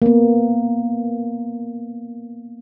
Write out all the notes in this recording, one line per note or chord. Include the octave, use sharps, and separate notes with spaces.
A#3 B3